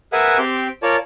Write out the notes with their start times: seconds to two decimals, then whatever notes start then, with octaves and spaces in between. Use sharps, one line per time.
0.13 G#4 A#4 B4 E5 F#5 G#5
0.39 C4 G4 C6 D6
0.83 F4 A#4 C#5 D5 A5